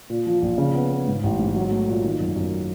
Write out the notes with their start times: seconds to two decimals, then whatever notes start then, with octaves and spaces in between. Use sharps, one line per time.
0.10 A#2
0.27 F3
0.42 A#1
0.58 C#3
0.74 B3
0.91 B3
1.08 G#2
1.23 A1
1.39 G#2
1.56 F#3
1.71 A3
1.88 A#2
2.04 D#3
2.20 F#2
2.36 F#2